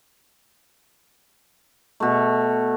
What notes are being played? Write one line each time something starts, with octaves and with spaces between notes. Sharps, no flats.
B2 A3